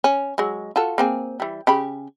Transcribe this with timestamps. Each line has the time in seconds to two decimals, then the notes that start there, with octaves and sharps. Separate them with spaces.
0.04 C#4
0.38 F#3 G#3
0.76 F4 F#4 A4
0.98 A#3 C4 G#4
1.40 E3 G3
1.67 C#3 G4 B5